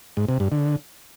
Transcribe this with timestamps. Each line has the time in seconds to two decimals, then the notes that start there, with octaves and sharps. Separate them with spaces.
0.17 G#2
0.29 C3
0.40 G2
0.52 D3